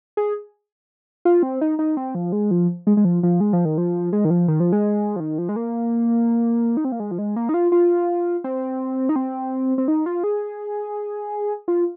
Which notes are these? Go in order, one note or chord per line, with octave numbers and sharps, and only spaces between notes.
G#4
F4
C4
D#4
D#4
C4
F3
G#3
F3
G#3
G#3
F3
F3
G#3
F3
D#3
F3
G#3
D#3
F3
D#3
F3
G#3
F3
D#3
F3
G#3
A#3
D#4
C4
A#3
G#3
F3
G#3
A#3
D#4
F4
F4
C4
D#4
C4
C4
D#4
F4
G#4
F4